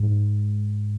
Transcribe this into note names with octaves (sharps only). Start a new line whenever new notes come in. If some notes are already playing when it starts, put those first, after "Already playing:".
Already playing: G#2